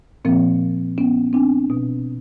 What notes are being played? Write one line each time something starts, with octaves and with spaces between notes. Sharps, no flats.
A#2 F3 A#3 C4
B3 C#4
C4 D4
B2